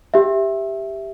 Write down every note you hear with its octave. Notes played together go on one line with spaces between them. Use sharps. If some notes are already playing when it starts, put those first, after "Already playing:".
G4 E5